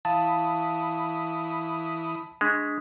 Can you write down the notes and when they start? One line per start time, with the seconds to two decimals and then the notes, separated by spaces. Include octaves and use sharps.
0.05 E3 F5 A5 B5 D#6
2.41 G#3 D4 C#6 B6